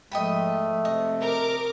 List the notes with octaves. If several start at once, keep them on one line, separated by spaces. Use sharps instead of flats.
G#2 F3 A3 D#5 G5 B5
C3 D#5
A#4 D6